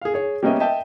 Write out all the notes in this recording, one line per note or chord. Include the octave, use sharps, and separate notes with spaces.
G#4 F5
G#4 C#5
G3 A#3 B3 C#4 D#5 E5
D#5 E5 G5 A5